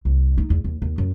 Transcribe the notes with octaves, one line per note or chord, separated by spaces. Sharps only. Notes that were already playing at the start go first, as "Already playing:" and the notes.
C2
D#4
E2
D#2
D#2
F#2